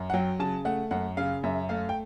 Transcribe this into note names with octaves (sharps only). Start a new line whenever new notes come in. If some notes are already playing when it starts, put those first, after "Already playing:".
Already playing: F#2
F#5
F#3 G5
C#3 A5
A3 F#5
F#2 F#5
C#3 F5
F#2 E5
A3 F5
G5